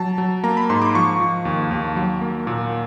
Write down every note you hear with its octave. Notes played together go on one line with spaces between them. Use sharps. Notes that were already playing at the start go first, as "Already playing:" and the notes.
Already playing: F#3 A5
F#3
A#3 A#5
B5
G#2 C6
D6
F3 C#6
F3
D#2
D#2
F#3
A#3
A#2